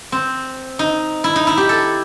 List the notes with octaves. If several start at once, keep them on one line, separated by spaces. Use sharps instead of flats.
C4
D#4
E4
D#4
E4
G4
A4